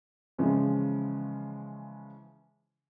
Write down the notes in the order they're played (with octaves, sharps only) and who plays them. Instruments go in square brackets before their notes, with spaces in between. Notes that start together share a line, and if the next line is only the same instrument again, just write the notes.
[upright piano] C#3 E3 F3 G#3 C#4